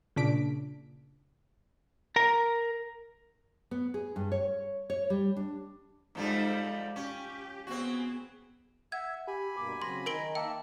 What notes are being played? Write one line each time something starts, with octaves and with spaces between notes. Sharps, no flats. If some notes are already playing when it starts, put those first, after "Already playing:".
A#2 C#3 D4 B6 D7
A#4 A#5
B3
G#4
G2
C#5
C#5
G3
D4
G#2 F3 G3 G#3 D#4 A4
C#4 G4
B3 C4 F#4 G#4
E5 F#5 G#6
G4 G#5 B5
G2 B2 A#3 D6
C#3 F#3 C4 C6 A#6
D#3 D#4 A#4 D7 G7
A#3 E5 G5 A5